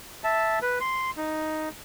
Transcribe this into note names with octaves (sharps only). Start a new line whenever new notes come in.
E5 A5
B4
C6
D#4